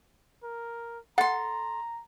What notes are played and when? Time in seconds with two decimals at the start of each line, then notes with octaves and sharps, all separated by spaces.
0.43 A#4
1.18 A4 F#5 A#5 C6